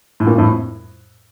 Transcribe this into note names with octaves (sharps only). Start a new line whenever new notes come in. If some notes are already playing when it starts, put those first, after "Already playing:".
A2
G2 A#2
F2 A2